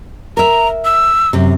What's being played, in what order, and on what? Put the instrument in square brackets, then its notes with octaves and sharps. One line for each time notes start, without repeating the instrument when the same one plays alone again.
[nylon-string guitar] A#4 E5 [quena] A#5
[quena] E6
[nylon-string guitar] F#2 C3